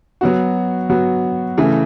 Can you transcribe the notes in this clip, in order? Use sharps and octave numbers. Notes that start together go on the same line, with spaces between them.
F#3 B3 F#4
F#3 B3 F#4
C#3 E3 A3